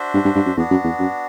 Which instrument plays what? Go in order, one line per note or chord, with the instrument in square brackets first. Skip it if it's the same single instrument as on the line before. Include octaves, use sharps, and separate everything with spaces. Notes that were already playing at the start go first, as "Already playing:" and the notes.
Already playing: [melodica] D4 F#4 C5 E5
[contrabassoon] G2
G2
G2
F#2
[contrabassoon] E2 [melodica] B3 D4 F#4
[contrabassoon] F#2
E2
F#2